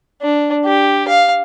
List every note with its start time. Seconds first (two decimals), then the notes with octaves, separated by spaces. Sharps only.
0.22 D4
0.65 G4
1.08 F5